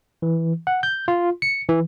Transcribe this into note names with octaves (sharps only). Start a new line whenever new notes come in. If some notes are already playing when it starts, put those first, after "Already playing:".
E3
F#5
G6
F4
C#7
E3